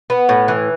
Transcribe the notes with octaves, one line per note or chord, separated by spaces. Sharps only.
B3
A2
E3